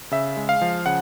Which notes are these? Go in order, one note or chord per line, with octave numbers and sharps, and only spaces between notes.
C#3 E5
G#3
F5
F3
C#3 F#5